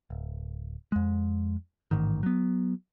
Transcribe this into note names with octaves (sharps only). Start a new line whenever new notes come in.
D1
F2 G#3
A1 G#2 D#3
F#3 B3